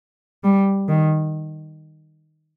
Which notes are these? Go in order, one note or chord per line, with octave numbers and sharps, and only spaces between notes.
G3
D#3